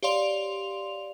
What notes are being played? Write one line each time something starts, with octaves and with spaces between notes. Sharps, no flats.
G4 C#5 D5 F5 C6 F7